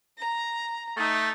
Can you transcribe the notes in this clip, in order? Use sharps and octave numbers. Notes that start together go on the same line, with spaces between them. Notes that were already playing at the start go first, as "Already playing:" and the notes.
A#5
A3 D#4